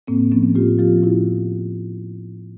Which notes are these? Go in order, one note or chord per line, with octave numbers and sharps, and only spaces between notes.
A2 A#3 C4
F3 B3 C#4
A2 F4 G4
F3 F4 G4
A2 E4 F#4